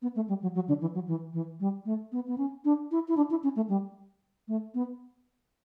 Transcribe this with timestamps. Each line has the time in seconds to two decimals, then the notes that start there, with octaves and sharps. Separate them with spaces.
0.02 B3
0.15 A3
0.29 G3
0.42 F#3
0.55 F#3
0.68 D3
0.81 E3
0.94 F#3
1.07 E3
1.33 E3
1.60 G3
1.85 A3
2.12 B3
2.27 B3
2.38 C#4
2.65 D4
2.91 E4
3.08 E4
3.17 D4
3.30 E4
3.43 C#4
3.56 A3
3.69 G3
4.48 A3
4.74 B3